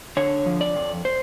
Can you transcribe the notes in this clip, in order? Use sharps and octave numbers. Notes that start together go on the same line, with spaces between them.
D3 C#5
F3
D5
F2
C5